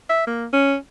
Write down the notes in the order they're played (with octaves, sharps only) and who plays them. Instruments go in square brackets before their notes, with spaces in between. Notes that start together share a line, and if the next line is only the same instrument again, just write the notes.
[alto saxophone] E5
A#3
C#4